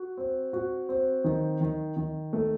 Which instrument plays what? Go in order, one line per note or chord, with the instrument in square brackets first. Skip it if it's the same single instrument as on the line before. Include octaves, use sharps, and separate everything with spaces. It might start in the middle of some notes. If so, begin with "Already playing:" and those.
Already playing: [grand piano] F#4
C4
F#4
C4
D#3
D#3
D#3
A3